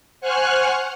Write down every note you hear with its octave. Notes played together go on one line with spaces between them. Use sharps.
C5 F#5 G#5 C#6 F6 F#6